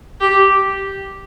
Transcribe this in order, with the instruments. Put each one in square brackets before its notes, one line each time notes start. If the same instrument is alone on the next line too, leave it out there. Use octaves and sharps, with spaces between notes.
[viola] G4